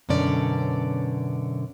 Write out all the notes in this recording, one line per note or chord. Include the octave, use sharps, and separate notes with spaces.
F#2 B2 D3 C#4 D5